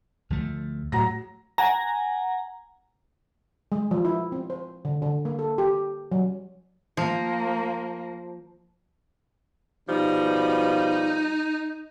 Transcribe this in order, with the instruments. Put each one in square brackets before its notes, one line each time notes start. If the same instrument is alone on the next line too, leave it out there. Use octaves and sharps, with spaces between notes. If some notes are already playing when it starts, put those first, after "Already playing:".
[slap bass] D2 F3 A3
[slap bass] A2 [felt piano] F#3 A#5 A#6
[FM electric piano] F#5 G#5 A#5
[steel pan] G#3
F3
E4
C4
C5
D3
D3
A#3
A4
G4
F#3
[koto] F3 [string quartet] A#3
[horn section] B2 F3 G3 [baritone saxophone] D#4